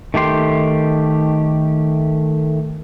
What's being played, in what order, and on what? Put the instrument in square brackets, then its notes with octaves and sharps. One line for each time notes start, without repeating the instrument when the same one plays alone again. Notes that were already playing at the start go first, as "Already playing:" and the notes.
[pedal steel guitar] D#3 A3 G4 C6